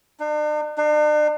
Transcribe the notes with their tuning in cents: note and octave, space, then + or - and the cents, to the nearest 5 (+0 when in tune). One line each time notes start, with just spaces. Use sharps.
D4 +45
D4 +45